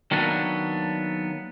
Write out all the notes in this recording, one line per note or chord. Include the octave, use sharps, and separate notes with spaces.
D#3 F#3 A#3 B3 D4